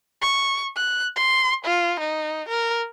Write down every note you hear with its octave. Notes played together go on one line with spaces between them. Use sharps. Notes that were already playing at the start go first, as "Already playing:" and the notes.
C#6
F#6
C6
F4
D#4
A#4